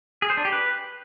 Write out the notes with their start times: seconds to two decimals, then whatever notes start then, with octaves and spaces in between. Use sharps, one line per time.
0.22 G#4
0.30 C5
0.37 D4
0.45 G4
0.52 B4